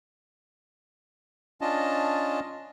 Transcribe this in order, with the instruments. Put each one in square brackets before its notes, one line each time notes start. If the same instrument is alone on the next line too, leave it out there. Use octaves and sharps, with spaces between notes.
[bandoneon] C#4 D4 F4 D#5 A5